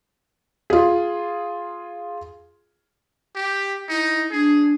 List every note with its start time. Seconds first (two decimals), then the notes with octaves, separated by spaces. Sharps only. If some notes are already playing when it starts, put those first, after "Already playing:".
0.70 F4 G#4
3.35 G4
3.89 D#4 E4
4.31 D4 G#4